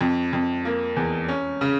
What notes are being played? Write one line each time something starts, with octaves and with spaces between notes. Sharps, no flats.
F2
F2
A#3
E2
C#4
C#3